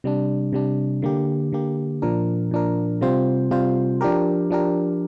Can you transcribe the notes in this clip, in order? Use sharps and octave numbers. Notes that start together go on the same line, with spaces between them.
C3 G3 D4
C3 G3 D4
D3 A#3 G4
D3 A#3 G4
A#2 F3 D4 A#4
A#2 F3 D4 A#4
C3 G3 C4 F4 C5
C3 G3 C4 F4 C5
F3 D4 G4 A#4
F3 D4 G4 A#4